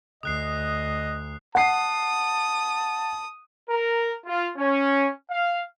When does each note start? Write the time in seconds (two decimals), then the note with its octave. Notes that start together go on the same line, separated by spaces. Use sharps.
0.23 D2 D#5 D#6 F#6 C7
1.55 F#5 A5 D#6 C7
3.69 A#4
4.26 F4
4.58 C#4
5.31 F5